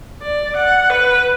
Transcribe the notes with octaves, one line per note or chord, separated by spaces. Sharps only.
D5
F#5
B4